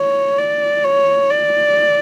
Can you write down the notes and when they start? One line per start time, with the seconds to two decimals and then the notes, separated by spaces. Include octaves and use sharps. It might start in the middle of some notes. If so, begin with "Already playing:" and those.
Already playing: C#5
0.39 D5
0.84 C#5
1.31 D5